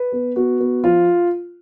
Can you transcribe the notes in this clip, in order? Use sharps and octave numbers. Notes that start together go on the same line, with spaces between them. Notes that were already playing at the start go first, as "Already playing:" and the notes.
Already playing: B4
B3
B3 F#4
B3
F3 F4